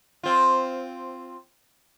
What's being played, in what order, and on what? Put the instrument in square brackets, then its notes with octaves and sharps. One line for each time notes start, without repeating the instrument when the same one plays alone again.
[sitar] C4 F4